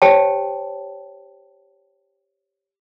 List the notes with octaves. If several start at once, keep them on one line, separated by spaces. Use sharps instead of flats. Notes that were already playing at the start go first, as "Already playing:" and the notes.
G4 C5 C#5 G5 A5